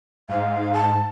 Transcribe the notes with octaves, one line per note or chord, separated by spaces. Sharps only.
G#2 F5
A5